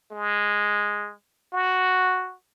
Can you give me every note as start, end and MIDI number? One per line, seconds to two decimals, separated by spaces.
0.12 1.13 56
1.53 2.34 66